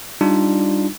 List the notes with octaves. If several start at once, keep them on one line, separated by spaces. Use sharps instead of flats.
G3 D4 D#4 F4